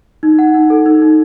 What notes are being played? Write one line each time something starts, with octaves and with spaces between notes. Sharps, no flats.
D#4
F#5
D#4
A4
D#4
D#4